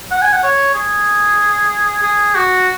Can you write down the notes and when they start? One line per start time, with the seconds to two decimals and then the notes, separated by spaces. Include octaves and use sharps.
0.11 F#5
0.22 G#5
0.33 F#5
0.43 C#5
0.75 G#4
2.03 G#4
2.35 F#4